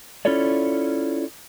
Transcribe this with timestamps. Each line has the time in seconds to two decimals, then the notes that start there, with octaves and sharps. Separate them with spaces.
0.25 C#4 E4 F4 A4 C#5 D5